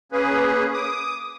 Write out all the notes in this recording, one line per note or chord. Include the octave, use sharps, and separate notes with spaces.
A#3 C#4 G#4 B4
D6 D#6